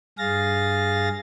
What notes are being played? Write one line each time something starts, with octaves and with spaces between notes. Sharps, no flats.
G2 G#4 F5 A6 A#6